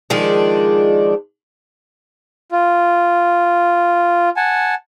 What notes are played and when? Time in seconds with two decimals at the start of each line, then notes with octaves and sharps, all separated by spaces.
0.10 D#3 F3 G#3 D4
2.52 F4
4.36 F#5 G#5 A5